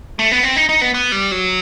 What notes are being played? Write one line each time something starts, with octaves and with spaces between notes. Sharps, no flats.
A3
B3
C4
D#4
D#4
B3
B3
G3
F#3